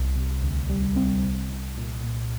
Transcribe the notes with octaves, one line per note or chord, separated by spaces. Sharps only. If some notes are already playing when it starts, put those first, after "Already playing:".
Already playing: C2
C3
D2
G3
C4
C2
C2
A#2
A#2